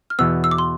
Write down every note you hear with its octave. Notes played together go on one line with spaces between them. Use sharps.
F6
E2 B2 B3 E6
E6
D6
C6